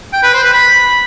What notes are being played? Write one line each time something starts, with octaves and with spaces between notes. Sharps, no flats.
G5
B4
C5
B4
B5